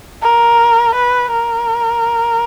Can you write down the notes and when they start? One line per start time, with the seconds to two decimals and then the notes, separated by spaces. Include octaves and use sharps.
0.22 A#4
0.95 B4
1.31 A#4